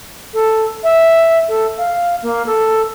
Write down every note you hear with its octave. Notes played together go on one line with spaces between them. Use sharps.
A4
E5
A4
F5
A#3
A4